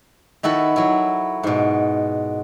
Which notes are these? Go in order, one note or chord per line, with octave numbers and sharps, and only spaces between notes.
D#3 E4 F#4 A4 B4
F#3 E4
G#2 B2